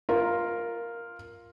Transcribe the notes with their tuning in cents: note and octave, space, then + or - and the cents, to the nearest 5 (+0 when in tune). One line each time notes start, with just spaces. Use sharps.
F4 +0 A#4 +0